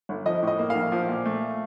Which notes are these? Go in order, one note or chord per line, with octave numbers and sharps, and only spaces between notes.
G1
F3 D#5
A2 D#5
A#3
F5
A#1
F3
A#2
A3